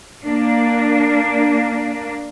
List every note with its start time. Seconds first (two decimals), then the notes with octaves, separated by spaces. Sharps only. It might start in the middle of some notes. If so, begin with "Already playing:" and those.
0.23 A#3 D4